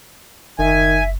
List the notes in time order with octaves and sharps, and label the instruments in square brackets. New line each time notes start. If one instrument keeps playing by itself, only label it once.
[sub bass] F#1 [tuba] D#3 [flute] E5 [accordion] G#5